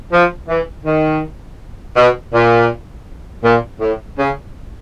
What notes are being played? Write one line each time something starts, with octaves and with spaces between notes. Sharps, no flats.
F3
E3
D#3
B2
A#2
A#2
A2
C#3